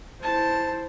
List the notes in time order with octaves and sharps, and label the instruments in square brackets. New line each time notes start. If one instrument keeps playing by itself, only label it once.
[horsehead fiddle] E4 C5 [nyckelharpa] A5